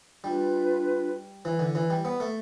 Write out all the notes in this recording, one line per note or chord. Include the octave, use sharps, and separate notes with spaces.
G3 D4 F4 B4
E3
D3
E3
G3
B3
A3